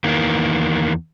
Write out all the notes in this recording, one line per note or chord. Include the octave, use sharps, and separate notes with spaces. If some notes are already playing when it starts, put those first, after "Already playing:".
E2 D#3 E3 A#3